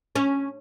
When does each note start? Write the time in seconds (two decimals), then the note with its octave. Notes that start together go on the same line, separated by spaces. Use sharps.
0.16 C#4